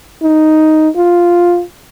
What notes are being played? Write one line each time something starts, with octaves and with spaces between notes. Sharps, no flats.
D#4
F4